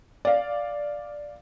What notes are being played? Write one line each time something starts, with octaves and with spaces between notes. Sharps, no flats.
D5 F5